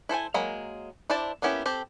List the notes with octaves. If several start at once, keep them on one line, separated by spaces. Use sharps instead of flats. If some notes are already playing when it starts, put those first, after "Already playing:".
E4 A4 C5 G#5
F#3 G#3 A#3 A#5 B5
D4 E4 C5 D5 A5
A#3 B3 C#4 E4 G4
C4 G4 A4